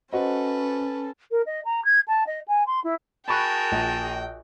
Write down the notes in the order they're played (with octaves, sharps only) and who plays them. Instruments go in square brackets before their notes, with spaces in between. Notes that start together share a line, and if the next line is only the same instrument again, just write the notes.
[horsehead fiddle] C#4 A4 [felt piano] F#4 C5 D#5 [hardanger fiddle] B4
[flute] A#4
D#5
A#5
G#6
A5
D#5
G#5
C6
E4
[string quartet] F#4 G#4 A#4 [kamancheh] G5 [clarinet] A5 [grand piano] B5 C#6 F#6
[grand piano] A#1